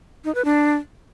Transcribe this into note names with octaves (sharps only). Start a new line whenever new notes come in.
D#4
B4
D4